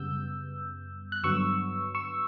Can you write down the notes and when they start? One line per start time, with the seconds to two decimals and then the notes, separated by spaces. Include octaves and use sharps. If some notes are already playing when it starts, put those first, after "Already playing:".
Already playing: F#2 C#3 G3 B3 E6 G6
1.12 F#6
1.23 G2 D3 F#3 B3 C#6 E6
1.95 C#6 E6